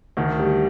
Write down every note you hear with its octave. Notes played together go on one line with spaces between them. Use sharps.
D2 D#3
G3